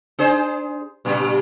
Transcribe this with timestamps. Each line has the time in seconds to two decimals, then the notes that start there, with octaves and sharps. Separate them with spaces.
0.19 D4 G#4 C5
1.05 G2 A#2 G3